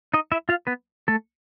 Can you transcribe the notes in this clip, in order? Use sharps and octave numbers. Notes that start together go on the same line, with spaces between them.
D#4 D#5
E4 E5
F4 F5
B3 B4
A3 A4